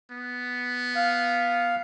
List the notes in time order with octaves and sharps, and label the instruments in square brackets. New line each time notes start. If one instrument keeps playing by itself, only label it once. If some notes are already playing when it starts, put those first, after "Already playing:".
[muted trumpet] B3
[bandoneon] F5